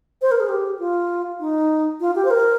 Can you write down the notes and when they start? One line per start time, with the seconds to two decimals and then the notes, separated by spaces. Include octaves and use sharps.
0.22 C5
0.31 A#4
0.40 G#4
0.49 G4
0.79 F4
1.40 D#4
2.00 F4
2.15 G4
2.25 C5
2.30 A#4